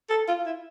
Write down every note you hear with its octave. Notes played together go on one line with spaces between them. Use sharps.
A4
F4
E4